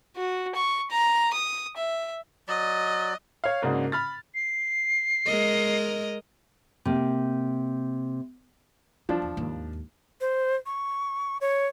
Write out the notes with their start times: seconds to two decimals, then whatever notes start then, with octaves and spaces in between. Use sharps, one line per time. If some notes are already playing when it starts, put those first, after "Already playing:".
0.17 F#4
0.55 C#6
0.91 A#5
1.33 D#6
1.77 E5
2.48 F#3 D5 D#5
3.44 C#5 F5
3.62 G#2 C#3 A#3 D4 F#4
3.92 B5 F6 A6
4.35 C7
5.26 G#3 A#4 D#5
6.85 C3 A#3
9.09 F3 D4 E4
9.22 E2
9.37 D#2 G#2
10.21 C5
10.66 C#6
11.41 C#5